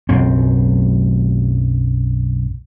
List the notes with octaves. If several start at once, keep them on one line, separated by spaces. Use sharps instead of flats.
B1 F#2 C4